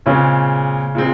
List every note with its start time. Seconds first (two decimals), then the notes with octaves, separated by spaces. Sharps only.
0.06 A#2 C#3 G#3 C4
0.95 A#2 G#3 C4